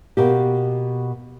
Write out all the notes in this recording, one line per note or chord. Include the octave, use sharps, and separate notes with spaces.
B2 A#3 G4